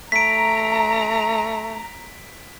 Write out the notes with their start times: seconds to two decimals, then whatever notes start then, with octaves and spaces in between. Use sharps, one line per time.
0.12 A3 A#5 B6 D7